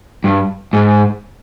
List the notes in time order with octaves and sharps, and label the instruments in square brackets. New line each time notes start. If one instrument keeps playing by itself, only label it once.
[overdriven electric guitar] G2
G#2